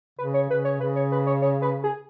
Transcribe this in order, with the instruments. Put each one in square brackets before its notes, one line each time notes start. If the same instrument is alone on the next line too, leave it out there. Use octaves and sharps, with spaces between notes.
[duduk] C#3 [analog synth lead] B4
[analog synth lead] C#5
[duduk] C#3 [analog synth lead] B4
[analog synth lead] C#5
[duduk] C#3 [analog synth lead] B4
[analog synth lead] C#5
B4
C#5
C#5
B4
G#4